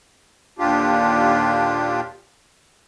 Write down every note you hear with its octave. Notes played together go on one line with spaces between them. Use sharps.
D#2 A#2 D3 D4 F4 G4